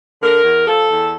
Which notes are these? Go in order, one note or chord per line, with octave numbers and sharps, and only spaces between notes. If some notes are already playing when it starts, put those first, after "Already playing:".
D3 A#4
E2
F3 A4
E2